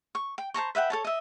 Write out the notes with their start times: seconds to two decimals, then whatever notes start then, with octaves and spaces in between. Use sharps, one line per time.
0.15 C#6
0.38 G5
0.54 C5 A5 A#5 C#6
0.75 B4 E5 F#5 G5
0.90 A4 C#5 A5
1.05 D#5 E5